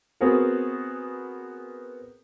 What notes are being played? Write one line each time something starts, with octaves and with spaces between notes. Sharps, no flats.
B3 C4 F#4 G#4 A#4